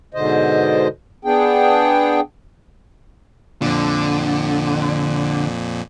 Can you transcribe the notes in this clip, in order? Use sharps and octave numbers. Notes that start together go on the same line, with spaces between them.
G#2 B2 D3 C5 D#5
B3 D4 G#4 G5
F2 A#2 D3